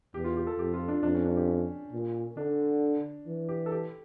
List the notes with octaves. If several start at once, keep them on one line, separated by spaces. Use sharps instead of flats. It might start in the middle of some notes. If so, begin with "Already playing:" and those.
E2 G4
F4
G4
A4
F2 G4
F4
D4
F2 D4
C#4
D4
G4
C#4
A#2
D3 D4
E3
G4
A4
G4